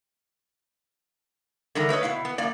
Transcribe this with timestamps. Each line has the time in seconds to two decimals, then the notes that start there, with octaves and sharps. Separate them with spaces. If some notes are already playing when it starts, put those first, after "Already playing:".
1.75 D3 D#3 G3 A3 A#4
1.89 A3 B4 C#5 D#5
2.03 B2 E4 F5
2.25 B3
2.38 F#2 A#3 D5